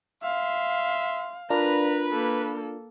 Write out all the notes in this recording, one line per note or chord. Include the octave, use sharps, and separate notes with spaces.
E5 F5 C6
D4 F4 A#4 B4 A#5
A#3 A4